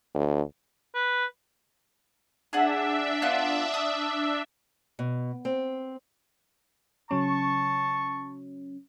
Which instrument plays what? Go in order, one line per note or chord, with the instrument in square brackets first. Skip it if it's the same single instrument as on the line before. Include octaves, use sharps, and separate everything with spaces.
[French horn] D2
[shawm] B4
[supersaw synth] D4 E5 [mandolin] G#4 F#5
[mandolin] B3 F4 F#6
D#6
[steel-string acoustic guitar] B2
C4
[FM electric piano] C#3 F#3 C#4 [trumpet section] A5 C#6